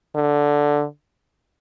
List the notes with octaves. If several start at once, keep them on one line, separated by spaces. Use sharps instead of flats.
D3